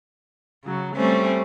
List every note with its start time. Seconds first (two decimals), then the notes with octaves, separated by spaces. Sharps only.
0.64 C#3 F#3
0.96 G3 A3 C4 C#4